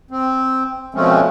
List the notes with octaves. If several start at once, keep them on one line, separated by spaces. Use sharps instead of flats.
C4
B2 F3 G#3 A3 C4 C#4